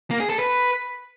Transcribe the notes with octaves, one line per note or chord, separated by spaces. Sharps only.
A#3
G#4
A4
B4